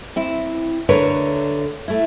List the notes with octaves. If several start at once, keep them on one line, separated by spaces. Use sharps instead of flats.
C4 E4
D2 D3 A#4 B4 C#5
A3 E4